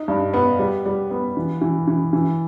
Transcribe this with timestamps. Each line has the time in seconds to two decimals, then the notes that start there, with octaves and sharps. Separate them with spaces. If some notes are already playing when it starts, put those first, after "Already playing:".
Already playing: D#4
0.08 G2
0.34 B3
0.59 G3
0.86 G3
1.11 B3
1.37 E3
1.62 E3
1.88 E3
2.13 E3